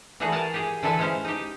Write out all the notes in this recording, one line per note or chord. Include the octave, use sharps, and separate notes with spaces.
E3 G3 A3 F#4 G#4
A#4 F#5 G#5 A5
G4 G#4
D3 E3 A4 B4 E5 G#5
G#3 C#4 E4 C5 F5
D#4 G4